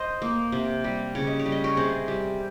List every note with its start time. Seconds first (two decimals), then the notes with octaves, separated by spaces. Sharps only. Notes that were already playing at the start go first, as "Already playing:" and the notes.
Already playing: C5 D#5
0.22 A#3
0.52 C3
0.84 G3
1.15 C#3 C#5
1.27 D#5
1.39 C#5
1.46 G3
1.52 D#5
1.64 A#4 C#5
1.77 C3 G#4 C5
2.08 G3